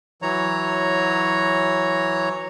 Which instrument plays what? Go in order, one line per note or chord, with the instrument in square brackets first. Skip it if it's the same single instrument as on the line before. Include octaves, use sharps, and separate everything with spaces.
[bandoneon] E3 F#3 C#5 A#5